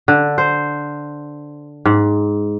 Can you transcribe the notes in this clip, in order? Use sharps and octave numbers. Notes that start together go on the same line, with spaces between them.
D3
C5
G#2